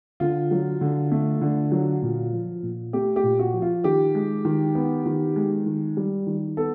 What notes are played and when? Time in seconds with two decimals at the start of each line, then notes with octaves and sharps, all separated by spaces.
0.20 D3 F4
0.51 F#3
0.81 D3
1.12 A3
1.41 D3
1.72 F#3
2.02 A#2
2.33 F3
2.63 A#2
2.93 A3 G4
3.16 G4
3.23 A#2
3.39 F#4
3.54 F3
3.62 F4
3.84 D#3 G4
4.15 G#3
4.45 D#3
4.75 B3
5.06 D#3
5.36 G#3
5.66 D#3
5.97 G3
6.27 D#3
6.57 B3 A4